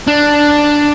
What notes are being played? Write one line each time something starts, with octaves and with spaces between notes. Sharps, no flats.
D4